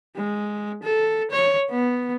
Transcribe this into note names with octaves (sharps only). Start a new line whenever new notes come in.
G#3
A4
C#5
B3